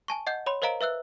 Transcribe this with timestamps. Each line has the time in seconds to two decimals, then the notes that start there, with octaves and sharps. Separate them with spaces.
0.08 G#5 A5 C#6
0.27 D#5 F#5 G6
0.46 C#5 B5 C6
0.62 A#4 C5 D#5 F5 A#5 D7
0.81 B4 E5 E6 F#6